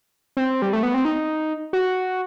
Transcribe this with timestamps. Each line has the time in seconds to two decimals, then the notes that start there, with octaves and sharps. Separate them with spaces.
0.37 C4
0.62 G3
0.73 A3
0.83 B3
0.94 C4
1.05 D#4
1.73 F#4